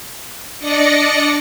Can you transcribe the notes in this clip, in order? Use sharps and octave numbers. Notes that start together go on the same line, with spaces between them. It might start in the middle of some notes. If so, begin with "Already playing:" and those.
D4 D5 D#5 A#6 C#7